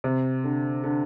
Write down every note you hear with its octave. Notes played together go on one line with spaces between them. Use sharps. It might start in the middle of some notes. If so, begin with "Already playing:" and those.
C3
D3
D3